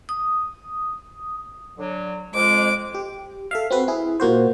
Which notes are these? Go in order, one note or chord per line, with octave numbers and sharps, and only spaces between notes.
D#6
D3 F#3
F2 G#3 D6
G4
A4 E5 F5
C4 F#4 B4
E4 G#4
A#2 A#3 F#4 C5